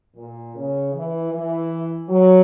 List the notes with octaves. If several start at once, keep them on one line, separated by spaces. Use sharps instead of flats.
A#2
C#3
E3
E3
F#3